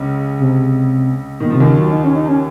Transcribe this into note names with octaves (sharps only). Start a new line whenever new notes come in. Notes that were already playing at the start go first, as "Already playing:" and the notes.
Already playing: C#2 C#3
C3
A#2 D#3
C3 F3
D#2 D#3
C#3
F#3
D#4
C#4
D#4
C#4